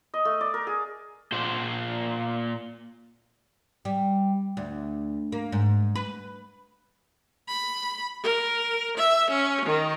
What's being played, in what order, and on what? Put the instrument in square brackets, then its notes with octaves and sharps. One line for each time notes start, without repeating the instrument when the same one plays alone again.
[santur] D#5
A3
D5
A#4
G#4
[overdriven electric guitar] A#2 C5
[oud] G3
D2
A#3
G#2
B4
[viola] B5
A#4
E5
C#4
D#3